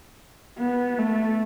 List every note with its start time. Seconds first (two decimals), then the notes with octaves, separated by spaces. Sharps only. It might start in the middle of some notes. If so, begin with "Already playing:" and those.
0.59 B3
0.99 A3